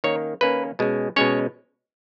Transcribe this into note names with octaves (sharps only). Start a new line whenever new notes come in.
D#3 A#3 C#4 C#5
D#3 A#3 C#4 B4
B2 G#3 C#4
B2 G#3 C#4 C#5